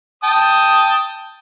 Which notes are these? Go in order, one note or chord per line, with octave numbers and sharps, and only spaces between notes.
G5 A5 D#6